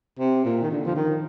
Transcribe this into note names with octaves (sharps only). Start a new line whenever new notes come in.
C3
A#2
D#3
D3
F3
D#3